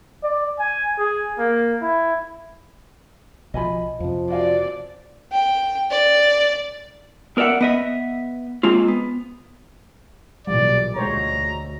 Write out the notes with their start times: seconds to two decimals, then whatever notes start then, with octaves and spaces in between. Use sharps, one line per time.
0.24 D5
0.59 G#5
0.98 G#4
1.39 A#3
1.82 E4
3.54 B1 F3 D#5 G#5 B5
4.00 F2 C3 F3
4.30 F#4 D5 F5 G#5
5.32 G5
5.91 D5
7.37 B3 A#4 D5 E5 F#5
7.61 B3 D#5 E5
8.63 G#3 A#3 C4 F4
8.88 B3
10.47 B1 A#2 E3 G3 D5
10.96 D2 G#3 C5 C#5 A#5